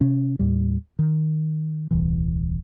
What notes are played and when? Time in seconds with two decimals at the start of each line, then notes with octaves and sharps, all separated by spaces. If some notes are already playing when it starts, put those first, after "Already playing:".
0.01 C3 C#4
0.39 D#2 A2 G3
0.99 D#3
1.91 D#1 C2 E3